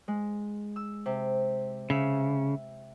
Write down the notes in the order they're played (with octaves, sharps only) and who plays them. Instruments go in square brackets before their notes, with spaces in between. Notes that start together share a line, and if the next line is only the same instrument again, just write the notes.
[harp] G#3
E6
C3
[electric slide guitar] C#3 [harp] E5